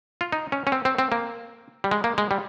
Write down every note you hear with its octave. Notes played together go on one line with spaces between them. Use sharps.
F4
D#4
C#4
C#4
C4
C4
C4
A#3
G3
G#3
A#3
G#3
G3